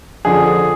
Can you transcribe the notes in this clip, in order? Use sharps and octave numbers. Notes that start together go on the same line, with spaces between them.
F2 D3 F3 G#4